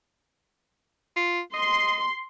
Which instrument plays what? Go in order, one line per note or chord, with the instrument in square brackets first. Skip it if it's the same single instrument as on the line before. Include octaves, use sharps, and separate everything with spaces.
[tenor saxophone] F4
[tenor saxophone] D#5 [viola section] C6